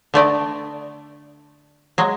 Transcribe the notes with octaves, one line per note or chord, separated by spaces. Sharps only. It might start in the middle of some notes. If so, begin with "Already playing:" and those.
D3 A3 D5 D#5
F#3 G#3